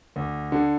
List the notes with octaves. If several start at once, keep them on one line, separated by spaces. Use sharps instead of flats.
D2
D3